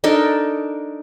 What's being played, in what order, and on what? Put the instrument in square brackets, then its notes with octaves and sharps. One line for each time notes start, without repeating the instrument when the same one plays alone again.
[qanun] D4 D#4 A4 A#4